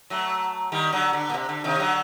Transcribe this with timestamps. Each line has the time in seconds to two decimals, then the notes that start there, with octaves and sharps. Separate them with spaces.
0.10 F#3 A3
0.72 D#3 G3
0.92 D3 F#3
1.13 D3
1.29 A#2
1.34 C3
1.49 D3
1.64 C3 D#3
1.79 D3 F#3